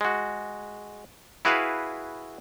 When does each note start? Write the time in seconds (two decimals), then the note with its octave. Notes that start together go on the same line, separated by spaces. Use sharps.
0.01 G#3 F#4
1.45 E4 F#4 G#4 B4 F5